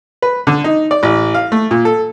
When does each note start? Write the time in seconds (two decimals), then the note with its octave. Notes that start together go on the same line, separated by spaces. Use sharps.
0.22 B4
0.47 D3
0.64 D#4
0.91 D5
1.03 A1
1.34 F5
1.52 A3
1.71 A#2
1.85 A4